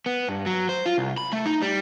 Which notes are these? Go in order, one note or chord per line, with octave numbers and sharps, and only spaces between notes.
B3
G2
F#3
C5
F4
C2
B5
A3
D#4
G3